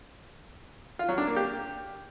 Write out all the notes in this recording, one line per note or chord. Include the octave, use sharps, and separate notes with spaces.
F4
F#3
D4
A#3
G4